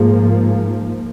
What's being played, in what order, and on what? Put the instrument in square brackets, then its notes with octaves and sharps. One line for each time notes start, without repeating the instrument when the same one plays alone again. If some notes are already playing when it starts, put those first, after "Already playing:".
Already playing: [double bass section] G#2 F3 A#3 [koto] G#3